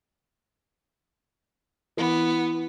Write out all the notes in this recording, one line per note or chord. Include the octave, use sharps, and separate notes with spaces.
E3 B3